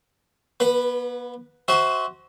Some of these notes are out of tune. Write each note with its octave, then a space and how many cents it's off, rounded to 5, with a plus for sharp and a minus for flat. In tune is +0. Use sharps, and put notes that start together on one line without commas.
B3 -40 B4 +0
F#4 +15 C5 +0 E5 -30